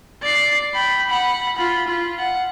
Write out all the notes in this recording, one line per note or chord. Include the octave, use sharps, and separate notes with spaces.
D5 C7
G5 B5
F#5 B5
F4 B5
F4
F#5